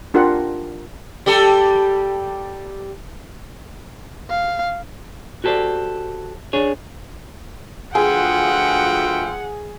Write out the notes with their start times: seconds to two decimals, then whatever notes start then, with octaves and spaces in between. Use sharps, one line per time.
0.14 D4 F4 G4 A#4 F#5
1.26 G3 G4 A4
4.30 F5
5.44 F#4 G4 A4 C5 D5
6.53 D4 G#4 C#5
7.95 D2 F3 F4 G#4 B4 E5 F#5 G5